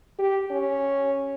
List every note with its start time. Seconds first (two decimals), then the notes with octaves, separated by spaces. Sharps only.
0.19 G4
0.51 C#4